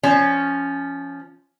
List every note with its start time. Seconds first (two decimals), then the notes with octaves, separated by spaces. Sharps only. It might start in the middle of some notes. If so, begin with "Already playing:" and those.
0.03 F3 C#4